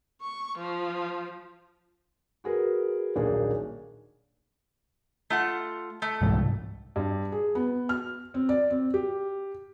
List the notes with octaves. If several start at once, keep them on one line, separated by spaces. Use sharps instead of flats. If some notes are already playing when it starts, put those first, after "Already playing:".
C#6
F3
F#4 G#4 A#4 B4
D#1 B1 A#3 D4 D#4 G#4
A3 F4 F#5
A3
C2 G#2
G2
G#4
B3
F6
C4
D5
C4
G4